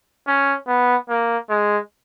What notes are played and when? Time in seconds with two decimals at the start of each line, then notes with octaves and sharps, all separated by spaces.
0.27 C#4
0.68 B3
1.09 A#3
1.49 G#3